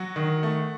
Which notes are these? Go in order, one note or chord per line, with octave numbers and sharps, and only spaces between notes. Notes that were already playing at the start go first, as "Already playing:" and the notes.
Already playing: F#3 F#4 F#5
D#3
A3